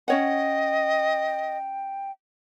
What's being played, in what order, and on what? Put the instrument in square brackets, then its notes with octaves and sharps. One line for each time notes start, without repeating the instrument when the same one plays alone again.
[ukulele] C#4 C#5 F#5 [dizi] D#5 [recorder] G5